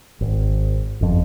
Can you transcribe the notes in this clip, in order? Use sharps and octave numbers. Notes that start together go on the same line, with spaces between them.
G#1
G1 F2